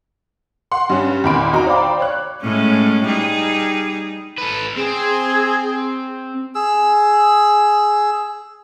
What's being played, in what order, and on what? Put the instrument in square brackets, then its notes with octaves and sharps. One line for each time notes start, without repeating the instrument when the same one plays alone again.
[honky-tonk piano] F#5 C6
G2 C#4
E2 A#2 D#3 B5 C6 D7
D#4 F#4 A#5
C5 D5 F5 G5 B5 D6
C#5 F#6
[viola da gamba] A2 G#3 C#4
G3 D#4 G#4
[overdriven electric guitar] A4 B4
[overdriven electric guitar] C4 [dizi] G#4
[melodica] G#4 E6